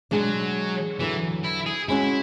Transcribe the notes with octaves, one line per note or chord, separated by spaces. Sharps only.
B2 F#3 G#3 D4 G#4 D5
E2 D3 E3 F#3 B3
E4
G#4
G#3 C#4 E4 F#4